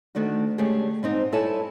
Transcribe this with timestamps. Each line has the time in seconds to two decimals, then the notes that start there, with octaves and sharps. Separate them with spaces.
0.15 D2 D#3 A3 D4 F#4
0.58 D3 G#3 A3 C#4 G4 G#4
1.03 G#2 C4 D#4
1.32 G2 E4 A4 C#5 G#5 A5